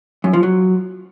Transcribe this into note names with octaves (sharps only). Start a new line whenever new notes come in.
F#2
F3
F#3